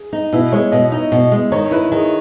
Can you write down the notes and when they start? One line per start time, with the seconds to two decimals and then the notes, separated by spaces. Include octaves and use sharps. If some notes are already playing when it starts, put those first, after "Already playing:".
Already playing: G#4
0.13 D#4
0.33 B2 E4
0.52 G#3 C#5
0.72 B2 D#5
0.92 D#4
1.12 B2
1.32 G#3
1.52 D#3 C#5
1.71 E4 B4
1.92 D#3 G#4